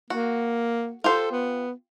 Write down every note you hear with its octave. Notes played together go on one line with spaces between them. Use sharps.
A#3 F#4
F4 G4 A4 C5
B3